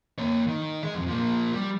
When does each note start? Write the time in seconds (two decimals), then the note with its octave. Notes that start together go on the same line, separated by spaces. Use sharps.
0.18 A#3 C#5
0.47 D#3
0.83 G#4 D#5
0.95 F2
1.07 F3 A#3
1.53 G3